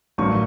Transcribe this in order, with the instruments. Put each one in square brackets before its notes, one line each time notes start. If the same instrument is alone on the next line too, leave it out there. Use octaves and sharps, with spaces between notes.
[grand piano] A1 G2 D#3 F#3 C#6